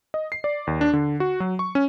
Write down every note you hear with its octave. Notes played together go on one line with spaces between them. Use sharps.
D#5
C7
D5
D#2
D4
D3
F#4
F#3
C#6
C#4